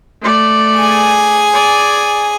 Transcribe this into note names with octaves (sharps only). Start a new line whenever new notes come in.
A3 D5
G#4 G#5
D5